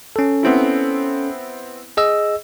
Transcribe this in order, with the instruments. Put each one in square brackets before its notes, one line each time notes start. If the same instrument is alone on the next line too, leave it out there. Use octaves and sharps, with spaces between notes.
[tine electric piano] C#4 A4
[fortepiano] B3 C4 E4
[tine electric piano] G#4 D#5 E6